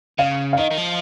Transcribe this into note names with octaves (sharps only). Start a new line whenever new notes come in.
C#3 F5
F5
D#3 D#5
D#3
F3